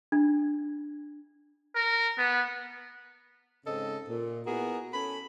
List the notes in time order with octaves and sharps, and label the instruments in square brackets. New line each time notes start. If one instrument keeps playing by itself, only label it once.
[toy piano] D4
[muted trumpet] A#4
B3
[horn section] G#2 C#3 C4 A4 D#5
A#2
B3 E4 F#4 G#4 A#4
C#4 A4 B5